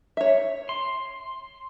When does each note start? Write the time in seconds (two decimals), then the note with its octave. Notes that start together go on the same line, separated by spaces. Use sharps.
0.17 C#5 E5
0.69 C6